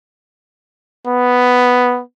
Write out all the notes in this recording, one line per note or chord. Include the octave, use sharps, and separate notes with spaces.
B3